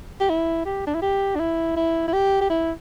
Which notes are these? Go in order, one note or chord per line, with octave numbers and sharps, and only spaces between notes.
G4
E4
G4
D4
E4
G4
D4
E4
E4
E4
G4
G4
E4